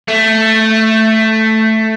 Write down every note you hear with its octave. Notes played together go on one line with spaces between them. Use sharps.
A3